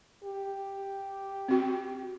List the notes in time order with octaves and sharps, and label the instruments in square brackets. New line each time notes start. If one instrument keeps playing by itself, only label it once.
[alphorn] G4
[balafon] C4 F#4